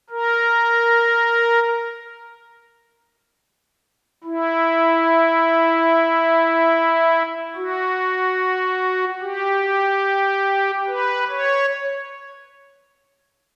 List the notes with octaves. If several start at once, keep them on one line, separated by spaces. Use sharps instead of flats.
A#4
E4
F#4
G4
B4
C#5